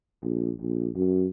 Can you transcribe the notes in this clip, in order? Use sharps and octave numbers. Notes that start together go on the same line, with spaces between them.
A#1
A#1
F#2